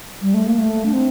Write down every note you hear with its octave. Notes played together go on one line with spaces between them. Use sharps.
G3
A3
A#3
A3
D4
C4